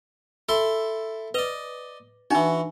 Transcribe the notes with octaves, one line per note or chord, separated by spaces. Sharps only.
E4 A4 C6
B4 D5 D#5
E3 D4 D#4 F#4